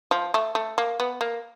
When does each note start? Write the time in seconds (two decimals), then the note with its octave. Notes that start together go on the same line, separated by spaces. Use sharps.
0.11 F3
0.34 A3
0.55 A3
0.78 A#3
1.00 B3
1.21 A#3